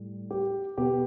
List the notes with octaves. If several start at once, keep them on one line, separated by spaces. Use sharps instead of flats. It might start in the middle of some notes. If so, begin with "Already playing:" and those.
Already playing: A2 G3
G4
B2 B3 G4